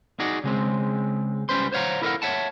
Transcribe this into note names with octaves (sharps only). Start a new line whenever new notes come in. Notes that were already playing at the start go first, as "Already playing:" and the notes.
D#4 F#4 G#4 D5
C#3 G#3 C4
C#2 G3 C#4 B4 C5 C6
C5 C#5 F5 F#5 A#5
E4 A4 A#4 D#5 F5 F#5
C#5 E5 F#5 A5